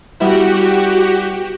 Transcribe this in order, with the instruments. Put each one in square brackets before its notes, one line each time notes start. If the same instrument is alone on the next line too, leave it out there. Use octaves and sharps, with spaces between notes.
[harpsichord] G3 B3 E4 [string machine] F#4 G4